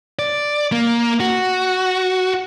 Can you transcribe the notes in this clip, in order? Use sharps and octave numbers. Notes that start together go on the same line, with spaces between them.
D5
A#3
F#4